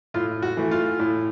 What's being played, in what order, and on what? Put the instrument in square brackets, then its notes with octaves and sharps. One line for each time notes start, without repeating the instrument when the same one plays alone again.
[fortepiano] A2 F4
F#4
E3 A3
F4
A2